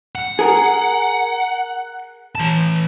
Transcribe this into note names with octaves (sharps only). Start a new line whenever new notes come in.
F#5
G#4 A#4
E3 A5